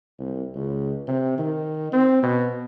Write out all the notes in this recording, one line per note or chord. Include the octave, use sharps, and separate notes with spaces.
C2
C#2
C3
D#3
C4
B2